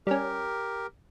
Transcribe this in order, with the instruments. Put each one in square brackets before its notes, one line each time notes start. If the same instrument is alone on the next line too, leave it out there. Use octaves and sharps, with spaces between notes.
[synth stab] G3 C#4 [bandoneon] G4 A#4